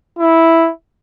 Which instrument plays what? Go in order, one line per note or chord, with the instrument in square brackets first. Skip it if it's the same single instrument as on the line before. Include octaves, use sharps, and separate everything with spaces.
[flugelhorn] E4